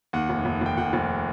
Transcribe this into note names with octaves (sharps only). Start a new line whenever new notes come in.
D#2 F#5
F1
F1
F1 G5
F1 F#5
F1